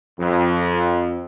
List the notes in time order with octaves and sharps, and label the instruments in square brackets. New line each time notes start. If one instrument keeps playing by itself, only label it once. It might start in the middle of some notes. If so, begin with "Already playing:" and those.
[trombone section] F2